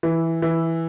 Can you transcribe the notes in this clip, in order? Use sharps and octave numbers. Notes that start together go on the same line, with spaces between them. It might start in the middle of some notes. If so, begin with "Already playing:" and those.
E3
E3